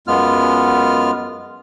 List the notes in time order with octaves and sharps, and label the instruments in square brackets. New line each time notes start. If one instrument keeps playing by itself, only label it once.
[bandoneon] F#2 G#3 B3 F4 F6